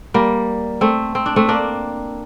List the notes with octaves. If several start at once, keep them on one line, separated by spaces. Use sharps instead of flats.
G3 A#3
A3 C4
C4
D4
A3 C4
A#3 D4